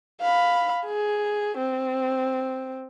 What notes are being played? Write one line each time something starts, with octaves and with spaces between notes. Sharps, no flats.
F5 B5
G#4
C4